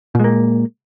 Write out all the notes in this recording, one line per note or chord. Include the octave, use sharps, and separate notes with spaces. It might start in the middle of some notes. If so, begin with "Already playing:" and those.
A#2 G#3 A#3